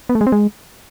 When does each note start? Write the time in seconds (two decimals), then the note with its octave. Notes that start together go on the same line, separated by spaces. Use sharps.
0.09 B3
0.15 A3
0.21 G#3
0.27 C4
0.32 G#3